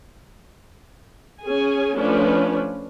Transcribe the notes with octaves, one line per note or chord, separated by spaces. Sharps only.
C#4 G#4 G#5
F3 A3 C#4 D4 B4